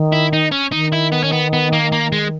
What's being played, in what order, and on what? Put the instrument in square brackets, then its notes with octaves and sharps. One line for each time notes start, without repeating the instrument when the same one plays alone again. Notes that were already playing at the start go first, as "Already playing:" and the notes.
Already playing: [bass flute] D#3
[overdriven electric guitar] E4
D#4
C#4
[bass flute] D#3 [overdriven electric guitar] D#4
[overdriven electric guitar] E4
B3
C#4
B3
B3
A#3
A#3
G#3